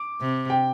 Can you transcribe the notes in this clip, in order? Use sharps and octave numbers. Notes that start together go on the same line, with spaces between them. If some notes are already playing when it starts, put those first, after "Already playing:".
Already playing: D6
C3
G5